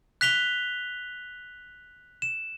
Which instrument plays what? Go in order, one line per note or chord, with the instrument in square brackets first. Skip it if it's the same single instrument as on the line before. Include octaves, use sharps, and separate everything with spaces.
[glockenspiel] F#6 B6 F7 G7
E7